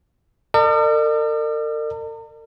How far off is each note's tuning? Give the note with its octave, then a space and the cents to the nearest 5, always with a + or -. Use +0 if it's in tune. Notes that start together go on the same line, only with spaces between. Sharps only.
A#4 -45 D5 +45